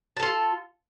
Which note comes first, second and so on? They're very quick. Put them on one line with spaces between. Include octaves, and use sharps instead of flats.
A5 A4 F4